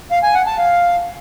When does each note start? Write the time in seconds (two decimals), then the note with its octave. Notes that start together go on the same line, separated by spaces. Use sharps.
0.12 F5
0.23 G#5
0.35 F#5
0.46 A5
0.58 F5